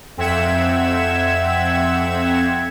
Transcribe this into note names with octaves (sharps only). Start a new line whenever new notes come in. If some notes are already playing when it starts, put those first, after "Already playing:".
F2 C4 E5 F#5 G#6 E7